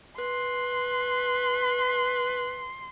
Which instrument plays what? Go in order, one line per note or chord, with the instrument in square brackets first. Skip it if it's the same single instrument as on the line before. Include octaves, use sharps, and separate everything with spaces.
[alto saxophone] B4 [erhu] C6